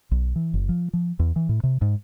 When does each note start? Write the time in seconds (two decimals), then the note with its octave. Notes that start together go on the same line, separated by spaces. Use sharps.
0.11 B1
0.36 E3
0.54 F#1
0.69 F3
0.93 F3
1.19 E2
1.36 E3
1.49 A2
1.63 C3
1.81 G#2